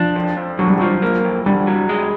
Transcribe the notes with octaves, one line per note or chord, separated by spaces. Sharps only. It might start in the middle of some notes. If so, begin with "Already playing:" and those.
Already playing: F3 D4
F2
F2
D3 F#3
G3
F3 F#3
A#3
F2
D3 G3
F#3
G#3